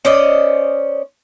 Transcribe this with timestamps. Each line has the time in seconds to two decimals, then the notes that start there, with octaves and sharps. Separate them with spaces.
0.05 C#4 C5 D5 D#5